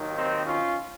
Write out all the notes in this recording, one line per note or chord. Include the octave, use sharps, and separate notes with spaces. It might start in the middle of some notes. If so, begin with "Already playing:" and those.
Already playing: D#2 D#3 F#3
C4 D#4
C#4 F4